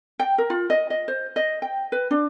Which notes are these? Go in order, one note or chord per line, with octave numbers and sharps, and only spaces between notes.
G5
A#4
F4
D#5
D#5
C5
D#5
G5
B4
D4